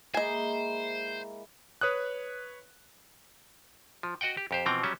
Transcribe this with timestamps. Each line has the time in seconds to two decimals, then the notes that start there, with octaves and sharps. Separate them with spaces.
0.14 G#3 A#3 E4 C5 D#5 G#5
1.81 B4 C#5 D#6 F#6
4.03 F3
4.21 F#4 D#5 F#5 G5
4.37 G4
4.51 F2 G4 C5
4.66 B2 E3 F3 C4 G5 A#5
4.83 F#3 G3 C#4 E5